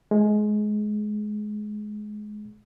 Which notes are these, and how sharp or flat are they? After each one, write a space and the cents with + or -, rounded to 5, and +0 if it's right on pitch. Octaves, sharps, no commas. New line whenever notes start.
G#3 +20